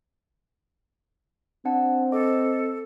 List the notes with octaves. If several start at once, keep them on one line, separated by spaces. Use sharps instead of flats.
C4 D4 F#5 A5
A4 D#5 D6